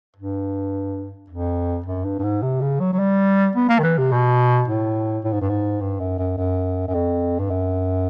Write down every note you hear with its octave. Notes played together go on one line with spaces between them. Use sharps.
G2
F2
F#2
G2
G2
G#2
C3
C#3
F#3
F#3
G3
B3
A#3
D#3
E3
C3
B2
A2
A2
G#2
G2
G#2
G2
F#2
F#2
F#2
F#2
F2
G2
F#2